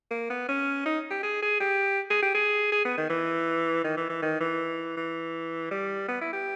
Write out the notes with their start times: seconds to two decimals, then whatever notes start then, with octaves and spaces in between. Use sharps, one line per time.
0.11 A#3
0.30 B3
0.49 C#4
0.86 D#4
1.10 G4
1.23 G#4
1.42 G#4
1.60 G4
2.10 G#4
2.23 G4
2.35 G#4
2.72 G#4
2.85 B3
2.98 D#3
3.10 E3
3.84 D#3
3.97 E3
4.09 E3
4.22 D#3
4.41 E3
4.97 E3
5.71 G3
6.09 B3
6.21 E4
6.33 G4